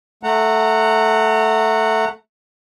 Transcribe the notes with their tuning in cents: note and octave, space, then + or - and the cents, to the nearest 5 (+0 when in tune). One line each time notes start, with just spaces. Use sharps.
A3 +0 F#5 +0 A#5 -30